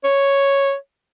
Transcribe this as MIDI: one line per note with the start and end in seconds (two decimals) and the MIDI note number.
0.04 0.75 73